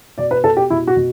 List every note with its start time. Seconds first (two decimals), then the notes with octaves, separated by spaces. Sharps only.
0.18 B2 D5
0.31 B4
0.44 B2 A4
0.57 G4
0.70 B2 E4
0.87 F#4
0.96 B2